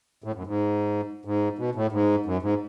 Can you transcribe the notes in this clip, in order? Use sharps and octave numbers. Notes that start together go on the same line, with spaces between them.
A2
F#2
G#2
G#2
B2
A2
G#2
F#2
G#2